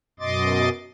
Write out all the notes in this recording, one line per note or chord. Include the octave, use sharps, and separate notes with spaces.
F#2 B2 D#5 C6 D6 A6